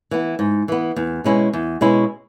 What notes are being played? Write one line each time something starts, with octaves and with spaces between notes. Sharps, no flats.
E3 B3
G#2
E3 B3
E2
B2 G#3 C#4 E4
E2
B2 G#3 C#4 E4